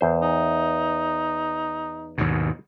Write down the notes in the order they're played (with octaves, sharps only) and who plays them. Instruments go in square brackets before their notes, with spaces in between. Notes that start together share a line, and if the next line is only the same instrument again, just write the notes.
[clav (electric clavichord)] E2 C5
[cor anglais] D#4
[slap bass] D#2 G#2 B2